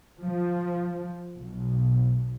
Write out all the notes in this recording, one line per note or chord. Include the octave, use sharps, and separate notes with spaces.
F3
B1